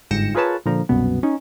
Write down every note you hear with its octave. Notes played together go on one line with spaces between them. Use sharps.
G1 G#2 G5 A#6 C#7 E7
F4 G#4 A#4 B4 C#5 A5
A#2 D3 F3 A#5
C2 F#2 B2 B3
C#4 D#4